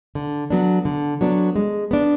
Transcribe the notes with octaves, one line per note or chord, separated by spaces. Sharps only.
D3
F#3 B3 D4
D3
F#3 B3 D4
G#3
B3 D4